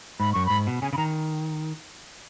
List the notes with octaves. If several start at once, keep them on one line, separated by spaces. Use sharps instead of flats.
G#2 B5
F#2 C#6
G#2 B5
B2
C#3 G#5
C#3 B5
D#3 A#5